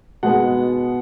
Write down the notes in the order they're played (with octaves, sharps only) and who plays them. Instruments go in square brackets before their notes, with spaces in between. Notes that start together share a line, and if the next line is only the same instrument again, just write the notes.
[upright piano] B2 G#3 B3 F#5